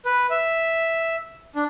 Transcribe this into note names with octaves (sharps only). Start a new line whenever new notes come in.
B4
E5
D4